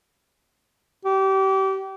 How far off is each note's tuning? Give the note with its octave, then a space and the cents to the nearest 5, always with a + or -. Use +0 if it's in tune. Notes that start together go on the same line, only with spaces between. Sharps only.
G4 -30